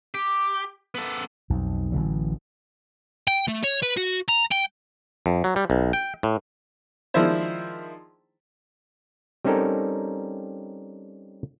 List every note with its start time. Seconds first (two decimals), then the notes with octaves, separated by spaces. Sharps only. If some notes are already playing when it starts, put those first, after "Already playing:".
0.14 G4
0.95 B3 A4
1.50 B1 F2
1.92 A1 D3 E3 F#3
3.28 G5
3.48 A3
3.63 C#5
3.82 B4
3.97 F#4
4.28 A#5
4.51 G5
5.26 F2
5.44 F#3
5.56 G3
5.70 B1
5.93 G5
6.23 A2
7.14 D#3 F3 G#3 D4 E4 C5
9.44 G3 C4 C#4 D#4 A4 A#4